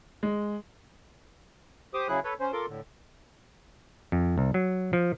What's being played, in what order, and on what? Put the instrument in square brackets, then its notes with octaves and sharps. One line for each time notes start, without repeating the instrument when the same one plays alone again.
[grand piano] G#3
[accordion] G4 C5 D6 D#6
C#3 F#3 E4 G#4 F#6
A4 B4 C#5
C#4 C5
F4 A4 A#4 C6 D6
A2 D3
[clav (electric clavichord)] F2
C2
F#3
F3